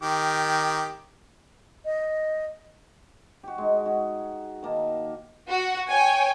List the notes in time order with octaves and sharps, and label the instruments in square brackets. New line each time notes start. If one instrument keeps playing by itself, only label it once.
[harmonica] D#3 G4
[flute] D#5
[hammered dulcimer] F#4 G4
G#3 D#4
F#4 G#4
D#3 A#3 A5
[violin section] F#4 F#5
C#5 G5 G#5